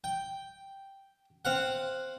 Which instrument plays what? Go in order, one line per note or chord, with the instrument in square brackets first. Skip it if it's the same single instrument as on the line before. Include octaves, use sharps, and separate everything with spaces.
[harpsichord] G5
C4 F5 F#5